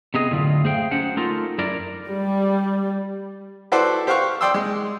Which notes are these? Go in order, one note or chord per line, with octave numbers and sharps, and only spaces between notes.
C3 B3 G#4 D#5
F#2 A2 D3 E4 F4
A3 G#4 C5 F5 G5
F#3 C#4 C5 F#5
A3 D#4 F4 A4 A#4
F#2 E4 A#4 D5
G3
E4 F#4 A4 B4 C5 D5
G4 C5 F5 F#5 C#6 F6
D5 G5 C6 D#6 E6
G#3